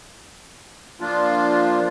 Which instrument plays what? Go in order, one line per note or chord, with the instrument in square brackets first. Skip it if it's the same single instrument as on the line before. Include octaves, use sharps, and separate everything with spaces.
[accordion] F3 A#3 D4 F4